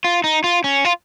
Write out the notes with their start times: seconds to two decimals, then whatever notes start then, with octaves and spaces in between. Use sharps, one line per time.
0.04 F4
0.24 D#4
0.44 F4
0.64 C#4
0.85 F4